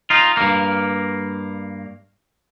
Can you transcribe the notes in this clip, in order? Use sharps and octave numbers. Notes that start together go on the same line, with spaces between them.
D#4 F4
G2 A#3